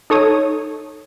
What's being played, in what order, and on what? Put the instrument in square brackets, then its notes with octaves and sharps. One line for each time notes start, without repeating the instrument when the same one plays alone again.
[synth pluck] D#4 A4 C#5 D#6